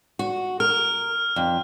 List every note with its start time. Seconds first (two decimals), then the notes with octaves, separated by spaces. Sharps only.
0.19 F#4
0.60 A#4 F6
1.36 F2